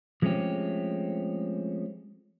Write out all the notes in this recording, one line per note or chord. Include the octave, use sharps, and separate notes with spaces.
F3 G#3 A3 C4 C#4 G4